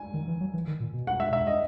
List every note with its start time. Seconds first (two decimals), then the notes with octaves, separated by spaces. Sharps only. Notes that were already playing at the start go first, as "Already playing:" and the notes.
Already playing: G#5
0.14 D#3
0.27 E3
0.40 F#3
0.54 E3
0.67 D#3
0.80 A#2
0.93 B2
1.07 F#5
1.20 E5
1.33 E5
1.47 D#5